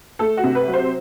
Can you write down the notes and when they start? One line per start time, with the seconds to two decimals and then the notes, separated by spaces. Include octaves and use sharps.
0.19 A3 A4
0.37 F#4
0.43 C3
0.55 B4
0.67 F#3
0.74 C5